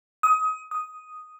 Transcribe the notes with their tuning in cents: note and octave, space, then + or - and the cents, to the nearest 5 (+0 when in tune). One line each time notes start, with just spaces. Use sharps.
D#6 +25
D#6 +0